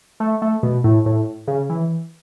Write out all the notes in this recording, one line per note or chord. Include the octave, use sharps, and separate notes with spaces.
A3
A3
B2
A2
A2
C#3
E3